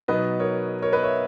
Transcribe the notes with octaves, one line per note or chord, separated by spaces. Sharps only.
B2 F#3 B3 D#4 B4 D#5
A#4 C#5
A#4 C#5
B4 D#5
C#5 E5